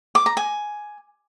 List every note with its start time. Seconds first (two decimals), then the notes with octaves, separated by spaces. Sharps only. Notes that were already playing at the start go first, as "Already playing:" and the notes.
0.15 D6
0.26 A#5
0.37 G#5